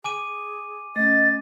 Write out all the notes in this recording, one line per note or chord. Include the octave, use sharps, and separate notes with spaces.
G#4 G#5 D6 D#7
A3 C#4 D#5 A6